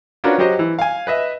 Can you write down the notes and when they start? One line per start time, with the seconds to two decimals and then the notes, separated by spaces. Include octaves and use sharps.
0.24 C#4 D4 F4 F#4 A#4 B4
0.38 F#3 F#4 G4 C5 D#5
0.59 E3
0.79 F5 G#5
1.07 B4 D#5 E5